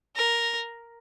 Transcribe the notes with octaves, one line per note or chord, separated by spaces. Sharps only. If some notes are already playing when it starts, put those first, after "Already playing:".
A#4